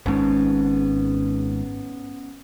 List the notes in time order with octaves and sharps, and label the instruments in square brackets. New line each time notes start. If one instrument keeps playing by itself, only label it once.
[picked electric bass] G#1 G#2 [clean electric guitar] B3 C#4 A5